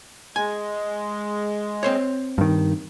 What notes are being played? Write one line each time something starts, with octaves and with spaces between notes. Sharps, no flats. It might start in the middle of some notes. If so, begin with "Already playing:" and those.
G#3 G#5
C4 C5 C#5
G2 D#3